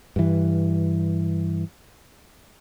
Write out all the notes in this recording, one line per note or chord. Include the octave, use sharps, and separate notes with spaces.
G2 E3